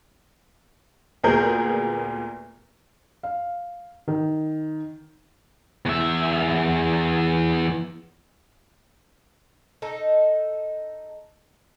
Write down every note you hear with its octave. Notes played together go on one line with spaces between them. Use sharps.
D2 A#2 B3 G#4 A#4 G6
F5
D#3
E2 E5
D#4 A4